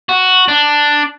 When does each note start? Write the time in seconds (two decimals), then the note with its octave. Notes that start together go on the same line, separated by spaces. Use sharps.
0.09 F#4
0.48 D4